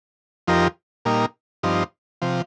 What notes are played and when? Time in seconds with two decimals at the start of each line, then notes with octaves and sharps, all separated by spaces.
0.48 F2 F3 D#4 G4 A#4
1.05 A#2 G3 A#3 D#4
1.63 G2 F3 C4 D#4
2.22 C3 F3